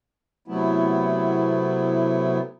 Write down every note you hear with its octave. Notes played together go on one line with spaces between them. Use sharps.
C3 F#3 A3 B3 E4